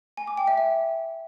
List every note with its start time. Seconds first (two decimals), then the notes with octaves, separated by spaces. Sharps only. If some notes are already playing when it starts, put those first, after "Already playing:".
0.17 G#5
0.27 D6
0.37 G5
0.48 E5
0.58 E5